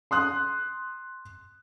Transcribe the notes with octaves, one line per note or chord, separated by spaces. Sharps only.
C6 D#6 F#6